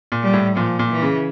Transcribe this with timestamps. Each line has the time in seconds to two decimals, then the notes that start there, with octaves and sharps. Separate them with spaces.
0.12 A#2
0.23 G3
0.33 A2
0.57 A#2 F3
0.79 A#2
0.91 E3
1.02 C#3